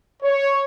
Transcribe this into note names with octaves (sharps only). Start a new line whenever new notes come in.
C#5